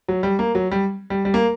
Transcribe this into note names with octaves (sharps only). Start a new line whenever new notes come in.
F#3
G3
A#3
F#3
G3
G3
G3
A#3